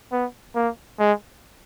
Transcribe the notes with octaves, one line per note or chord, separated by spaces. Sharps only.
B3
A#3
G#3